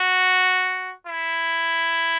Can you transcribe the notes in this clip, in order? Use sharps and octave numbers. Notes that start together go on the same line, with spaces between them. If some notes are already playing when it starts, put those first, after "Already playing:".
Already playing: F#4
E4